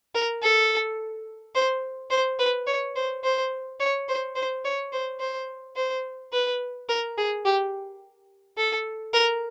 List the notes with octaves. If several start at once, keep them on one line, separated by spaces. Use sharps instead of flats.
A#4
A4
C5
C5
B4
C#5
C5
C5
C#5
C5
C5
C#5
C5
C5
C5
B4
A#4
G#4
G4
A4
A#4